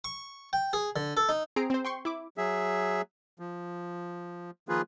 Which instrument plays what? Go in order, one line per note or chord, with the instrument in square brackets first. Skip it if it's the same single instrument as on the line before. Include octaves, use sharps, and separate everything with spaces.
[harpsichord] C#6
G5
G#4
D3
A4
D#4
[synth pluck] C4 G#4 A#5 C7 D7
C4 C5
G5 C6 C#6
E4 D6
[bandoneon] F#3 G#4 E5
F3
D#3 F3 A#3 F4 G#4 B4